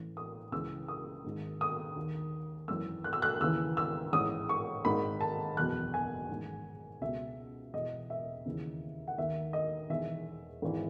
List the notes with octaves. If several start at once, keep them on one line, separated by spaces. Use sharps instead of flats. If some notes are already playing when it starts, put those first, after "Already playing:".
Already playing: A1 A2 E3
D#6
C#2 C#3 E3 E6
D#6
G#1 G#2 D#3
D#6
D#2 D#3
G#1 F#2 E3 E6
F#6
E6
F#6
D#2 C#3 E3 E6
E6
A1 G#2 E3 D#6
C#6
G#1 G#2 D#3 B5
A5
F#1 E2 B2 F#6
G#5
A1 G#2 D#3
C#2 B2 E5
E1 E2 B2 D#5
E5
D#2 C#3 E3
F#5
D#2 D#3 E5
D#5
E1 E2 D#3 E5
G#1 G#2 E3